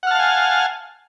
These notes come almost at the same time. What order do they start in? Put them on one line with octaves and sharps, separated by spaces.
F#5 F6 A5 F5 G#5